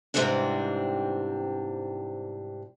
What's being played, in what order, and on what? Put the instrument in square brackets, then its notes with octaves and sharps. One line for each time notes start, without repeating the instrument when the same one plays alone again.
[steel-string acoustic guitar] G#2 C3 E3 G3 C4 D4